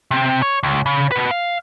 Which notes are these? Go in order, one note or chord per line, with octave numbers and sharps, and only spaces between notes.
C3 C4
C#5
C#2
C#3
B2 B4
F5